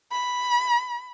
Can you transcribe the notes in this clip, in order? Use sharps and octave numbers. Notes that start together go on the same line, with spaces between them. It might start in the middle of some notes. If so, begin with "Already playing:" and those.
B5